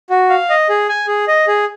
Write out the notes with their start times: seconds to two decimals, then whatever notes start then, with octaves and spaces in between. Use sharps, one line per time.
0.10 F#4
0.29 F5
0.50 D#5
0.69 G#4
0.89 G#5
1.07 G#4
1.28 D#5
1.47 G#4